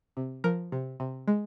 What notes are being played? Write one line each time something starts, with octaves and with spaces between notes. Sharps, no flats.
C3
F3 A#4
C3
C3
G#3